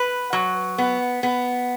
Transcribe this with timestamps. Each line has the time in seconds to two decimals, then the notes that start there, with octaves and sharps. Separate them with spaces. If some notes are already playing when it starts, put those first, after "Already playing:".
Already playing: B4
0.33 F#3
0.78 B3
1.23 B3